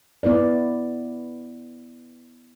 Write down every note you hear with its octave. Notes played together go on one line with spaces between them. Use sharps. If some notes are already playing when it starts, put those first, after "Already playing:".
B3 E4 B4 D5